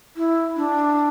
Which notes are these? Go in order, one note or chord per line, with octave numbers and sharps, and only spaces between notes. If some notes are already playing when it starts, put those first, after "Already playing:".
E4
D4